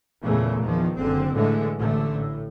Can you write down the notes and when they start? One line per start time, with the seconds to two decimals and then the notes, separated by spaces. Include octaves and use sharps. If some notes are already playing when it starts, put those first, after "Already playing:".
0.22 E2 A#2 C#3 A3
0.63 E2 D#3 F3
0.96 F#1 D3 C4
1.33 A2 D3 E3 G#3 A3
1.79 A1 A2 D3 A3
2.15 A2